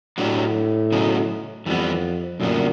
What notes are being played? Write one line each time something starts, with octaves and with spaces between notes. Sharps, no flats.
A2 F#3 A3 D4 G4
C#3 F#3 B3 D#4 G#4
F2 E3 G3 B3
F#2 A#2 D3 G3 B3